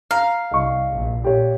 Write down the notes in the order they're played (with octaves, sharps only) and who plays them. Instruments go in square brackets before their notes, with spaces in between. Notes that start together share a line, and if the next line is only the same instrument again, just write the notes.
[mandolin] F5 [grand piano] A#5
[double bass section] C2 [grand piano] D#5 C#6
[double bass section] A#1
[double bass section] A#2 [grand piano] G4 C#5